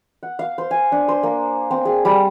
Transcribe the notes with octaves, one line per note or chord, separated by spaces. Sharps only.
F#5
F5
C5
G#5
D4
C5
A#3
C4
G#4
G3